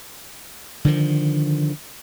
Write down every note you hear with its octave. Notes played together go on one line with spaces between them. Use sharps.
D3 D#3 F3